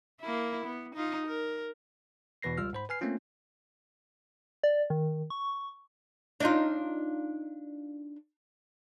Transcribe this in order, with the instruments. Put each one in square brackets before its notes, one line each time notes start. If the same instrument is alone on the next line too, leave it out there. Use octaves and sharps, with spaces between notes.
[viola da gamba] A#3 E4
B3
D#4 F4
A#4
[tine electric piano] E2 B2 E3 B4 A#6 C7
C#2 G3 F4 E6 F6
G#2 C5 B5
B4 G#5 F6 C7
A3 A#3 C4 C#4 F4
[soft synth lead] D5
D#3
C#6
[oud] D4 D#4 F4